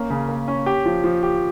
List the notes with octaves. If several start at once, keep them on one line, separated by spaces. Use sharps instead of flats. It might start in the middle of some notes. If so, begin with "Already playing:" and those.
Already playing: A#3 C#4
C#3
A#3
C#4
G4
F3
F3
G4